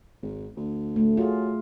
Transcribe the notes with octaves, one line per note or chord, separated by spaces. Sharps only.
G#1
D2
A3
F#3 F4 G#4